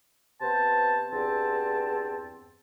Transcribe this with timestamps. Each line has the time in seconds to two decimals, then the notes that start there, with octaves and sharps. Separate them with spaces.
0.42 C3 B3 C5 A5
1.12 E2 G2 C4 A5